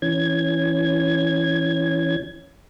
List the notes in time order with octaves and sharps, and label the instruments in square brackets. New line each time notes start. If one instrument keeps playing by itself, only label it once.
[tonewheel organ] E3 C#4 G#6